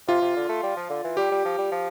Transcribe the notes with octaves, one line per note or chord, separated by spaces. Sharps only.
C3 F4
C3
D3
A3
G3
F3
D3
E3
G3 G4
G3
F3
G3
F3